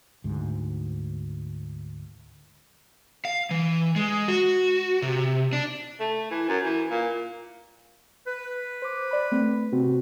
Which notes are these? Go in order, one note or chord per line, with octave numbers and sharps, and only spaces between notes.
D2 G#2
F5
E3
G#3
F#4
C3
D4
A3
E3
F#2
E3
A#2
B4
C5 D6
C5 D5 B5
A3 C4
C3 C4 F#4